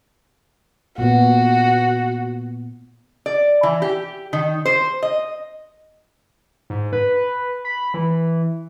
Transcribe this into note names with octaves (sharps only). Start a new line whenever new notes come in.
A#2 B3 F#4
D5
E3
G4
D#3
C5
D#5
G#2
B4
B5
E3